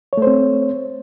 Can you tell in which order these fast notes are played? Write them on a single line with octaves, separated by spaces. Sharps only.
C#5 A3 C5 C4